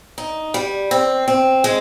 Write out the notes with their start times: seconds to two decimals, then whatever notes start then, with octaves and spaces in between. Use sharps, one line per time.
0.18 D#4
0.54 G3
0.91 C4
1.28 C4
1.64 G#3